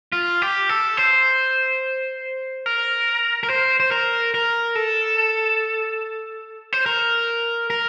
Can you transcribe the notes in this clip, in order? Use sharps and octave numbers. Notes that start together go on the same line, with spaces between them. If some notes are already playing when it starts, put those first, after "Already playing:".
F4
G4
A4
C5
A#4
A#4
C5
C5
A#4
A#4
A4
C5
A#4
A#4